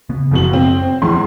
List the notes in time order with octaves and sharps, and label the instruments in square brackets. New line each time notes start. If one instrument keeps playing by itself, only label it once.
[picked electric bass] C#3 B3
[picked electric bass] F#1 [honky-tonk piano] F2 B2 F#7
[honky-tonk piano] C4
[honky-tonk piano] E2 G#3 C6 [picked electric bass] F3 C#4